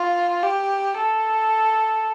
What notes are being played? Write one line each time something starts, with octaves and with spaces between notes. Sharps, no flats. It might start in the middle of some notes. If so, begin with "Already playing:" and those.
Already playing: F4
G4
A4